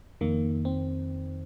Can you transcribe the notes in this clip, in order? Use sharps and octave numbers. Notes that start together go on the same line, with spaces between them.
F2 D#3 A#3
C4